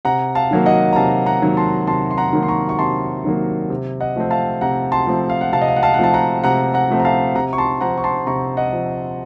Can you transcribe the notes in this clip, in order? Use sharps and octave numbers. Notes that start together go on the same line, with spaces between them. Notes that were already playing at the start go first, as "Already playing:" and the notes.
C3 F#5 A#5
F5 A5
D#3 F#3 A#3
D#5 F#5
A#5
C3 F5 A5
F#5 A#5
D#3 F#3 A#3
A5 C6
C3 A5 C6
C6
F#5 A#5
D#3 F#3 A#3
C6
A#5 C#6
C#6
C3 A5 C6
D#3 F#3 A#3
C3
D#5 F#5
F3 A3 C4
F5 A5
C3 F#5 A#5
A5 C6
F3 A3 C4
F5
F#5
C3 F5 A5
D#5
F5
F#5
F5 A5
F#5
F3 A3 C4 A5
F#5 A#5
C3 F#5 A#5
F#5 A#5
F3 A3 C4
A#5
F5 A5
C3 F#5 A#5
C#6
A5 C6
F3 C4 F#5 A#5
C#6
A5 C6
C3 A#5 C#6
D#5 F#5
F3 C4